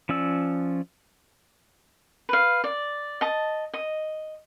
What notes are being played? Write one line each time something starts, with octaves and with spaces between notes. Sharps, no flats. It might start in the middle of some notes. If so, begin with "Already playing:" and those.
F3 C#4 D5 E6
B4 F5
D5
D#5 A5
D#5